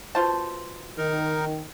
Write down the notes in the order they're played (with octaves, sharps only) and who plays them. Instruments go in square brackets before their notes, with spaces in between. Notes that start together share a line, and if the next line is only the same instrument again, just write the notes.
[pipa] B2 F4 C5 [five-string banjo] A5
[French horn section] D#3 [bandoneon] D#4 A#4